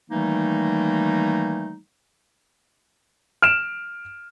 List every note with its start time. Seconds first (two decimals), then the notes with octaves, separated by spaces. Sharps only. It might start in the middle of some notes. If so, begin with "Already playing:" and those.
0.11 D#3 E3 G3 A3 A#3 D#4
3.42 F6 D7 E7